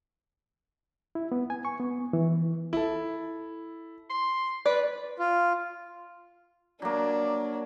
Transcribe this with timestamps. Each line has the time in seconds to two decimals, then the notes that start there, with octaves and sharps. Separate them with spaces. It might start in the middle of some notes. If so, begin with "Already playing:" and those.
1.15 E4
1.32 B3
1.50 G#5
1.65 C#6
1.80 B3
2.13 E3
2.73 E4 A4
4.10 C6
4.66 B4 D5
5.19 F4
6.82 F#3 A#3 D4